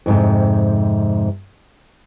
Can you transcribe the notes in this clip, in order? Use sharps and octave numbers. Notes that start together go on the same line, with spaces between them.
F2 G#2 C3